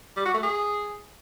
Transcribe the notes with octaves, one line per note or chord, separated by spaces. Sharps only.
G3
F#4
A3
G#4